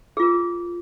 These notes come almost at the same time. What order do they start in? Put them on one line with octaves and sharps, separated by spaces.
G#4 F4 A#4